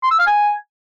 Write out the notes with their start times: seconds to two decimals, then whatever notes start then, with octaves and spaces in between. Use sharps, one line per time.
0.03 C6
0.11 E6
0.19 F5
0.27 G#5